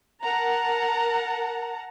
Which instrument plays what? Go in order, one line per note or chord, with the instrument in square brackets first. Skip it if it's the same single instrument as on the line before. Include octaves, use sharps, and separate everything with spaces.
[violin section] A#4 F#5 A5 A#5